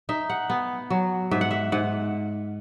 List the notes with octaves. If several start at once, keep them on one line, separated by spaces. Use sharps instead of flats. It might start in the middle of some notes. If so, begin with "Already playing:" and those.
D#4 E5
F#5
B3
F#3
G#2 E5
F#5
E5
G#2 F#5